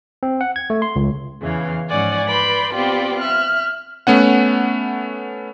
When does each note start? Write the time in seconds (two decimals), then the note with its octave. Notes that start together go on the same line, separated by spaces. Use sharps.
0.23 C4
0.41 F#5
0.56 G#6
0.70 A3
0.82 C6
0.96 C#2
1.40 E2 C#3 E3 F5
1.89 G#2 F3 C#4 D5 F#5 G#5
2.27 B4 D5 B5 C6 G6
2.73 B3 C4 F4 G4 D5 G5
3.18 E5 F6 F#6
4.07 A3 B3 C#4 F#5